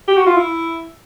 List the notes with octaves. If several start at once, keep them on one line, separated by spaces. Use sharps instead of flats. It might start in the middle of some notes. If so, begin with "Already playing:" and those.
G4
F#4
F4
E4